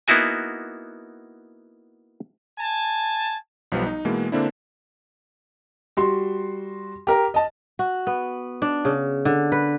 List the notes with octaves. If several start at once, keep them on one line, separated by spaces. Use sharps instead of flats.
A#3 B3 D#4 E4 F#4 G#5
G#5 A5
B1 F3 G3 B3
D#4
B2 E3 G#3 A#3
D3 A#3 C4 D4 E4
G3 F#4 C6
G4 A#4 A#5
D#5 A5
F#4
B3
D4
C#3
D3
B4